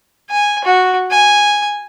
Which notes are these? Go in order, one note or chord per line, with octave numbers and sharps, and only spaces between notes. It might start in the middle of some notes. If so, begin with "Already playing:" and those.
G#5
F#4
G#5